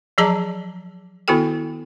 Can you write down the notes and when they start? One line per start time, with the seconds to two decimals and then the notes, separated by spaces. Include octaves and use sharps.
0.18 F3 F#3 G#4 D#5 A5 A#5
1.28 D#3 B3 E4 F#4 A4 G5